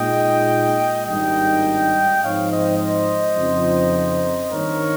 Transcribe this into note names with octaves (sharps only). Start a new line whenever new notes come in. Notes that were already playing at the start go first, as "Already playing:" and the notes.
Already playing: A#2 G#3 D#4 D#5 G5
G#1 G2 G3 A#3 D#4 D#5 G5
G#2 F3 C4 D#4 C#5 F5
C5 D#5
C5 D#5
F2 C#3 F3 C4 D#4
G2 D#3 A#3 D#4 A#4 C#5